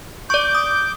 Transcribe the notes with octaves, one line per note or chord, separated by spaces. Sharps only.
D5 C#6 D6 G6
D#6